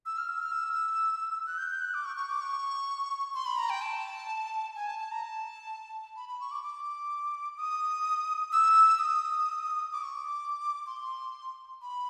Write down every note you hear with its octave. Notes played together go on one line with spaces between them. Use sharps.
E6
F6
E6
F6
E6
F#6
G6
G6
F#6
D6
C#6
C#6
D6
C#6
C6
B5
A#5
G5
A5
G#5
A5
A5
A#5
A5
B5
B5
C#6
D6
D6
D#6
E6
D#6
D6
C#6
D6
C6
B5